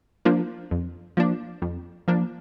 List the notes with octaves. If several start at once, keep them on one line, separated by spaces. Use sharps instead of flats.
F3 A#3 D4
F2
F3 A#3 D4
F2
F3 A#3 D4